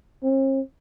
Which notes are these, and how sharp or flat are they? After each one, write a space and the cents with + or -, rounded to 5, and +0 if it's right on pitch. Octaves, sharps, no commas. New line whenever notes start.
C4 +45